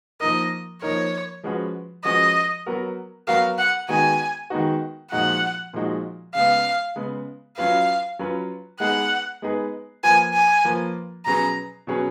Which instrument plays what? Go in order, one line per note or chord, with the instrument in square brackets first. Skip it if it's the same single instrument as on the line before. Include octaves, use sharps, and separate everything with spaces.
[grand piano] F3 A#3 D#4 A#4 [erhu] D#5
[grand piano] F3 A#3 D#4 A#4 [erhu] C#5
[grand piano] F3 G#3 C#4 F#4 B4
[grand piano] F3 G#3 C#4 F#4 B4 [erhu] D#5
[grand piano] F#3 B3 F#4 A#4
[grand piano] F#3 B3 F#4 A#4 [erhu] F5
[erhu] F#5
[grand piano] D#3 G#3 B3 D#4 F#4 [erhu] G#5
[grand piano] D#3 G#3 B3 D#4 F#4
[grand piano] A#2 F3 G#3 D#4 F#4 [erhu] F#5
[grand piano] A#2 F3 G#3 D#4 F#4
[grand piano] C#3 G#3 B3 [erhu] F5
[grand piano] C#3 G#3 B3
[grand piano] F#3 C#4 F4 B4 [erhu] F5
[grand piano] F#3 C#4 F4 B4
[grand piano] G#3 B3 D#4 G#4 B4 [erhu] F#5
[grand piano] G#3 B3 D#4 G#4 B4
[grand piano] F3 A#3 F4 B4 [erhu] G#5
[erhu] G#5
[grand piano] F3 A#3 F4 B4
[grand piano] B2 F#3 C#4 G#4 B4 [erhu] A#5
[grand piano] B2 F#3 C#4 G#4 B4